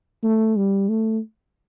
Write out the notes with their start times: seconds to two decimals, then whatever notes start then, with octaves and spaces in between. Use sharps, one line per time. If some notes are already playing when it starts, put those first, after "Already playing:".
0.24 A3
0.56 G3
0.89 A3